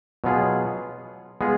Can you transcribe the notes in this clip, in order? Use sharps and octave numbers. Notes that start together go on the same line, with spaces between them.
B2 F#3 B3 F4 G#4
G#3 B3 F4 G#4